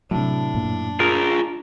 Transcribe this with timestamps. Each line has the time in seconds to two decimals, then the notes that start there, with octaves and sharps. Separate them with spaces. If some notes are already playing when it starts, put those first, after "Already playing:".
0.11 A2 C3 F#3 D4
0.54 F#2 A#2
1.00 F4 G#4 A#4